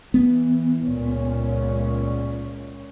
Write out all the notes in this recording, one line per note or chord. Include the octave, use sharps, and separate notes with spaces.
E3 B3
C#2 A#2 C#4